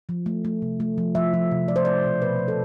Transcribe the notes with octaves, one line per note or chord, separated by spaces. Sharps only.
F3
A3
A3
C3
A3
F3
F3 E5
F3
C3
A3 D5
C5
A3 D5
B2
B2 B4
B2
A4